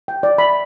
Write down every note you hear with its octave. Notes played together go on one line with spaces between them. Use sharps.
G5
D5
B5